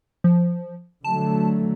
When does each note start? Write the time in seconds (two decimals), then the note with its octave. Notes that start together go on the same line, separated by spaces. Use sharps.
0.24 F3
1.04 D3 F#3 A3 A5